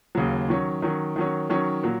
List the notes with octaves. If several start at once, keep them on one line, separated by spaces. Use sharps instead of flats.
D#2 C#3 F#3
D#3 F#3 C#4
D#3 F#3 C#4
D#3 F#3 C#4
D#3 F#3 C#4
A#2 F#3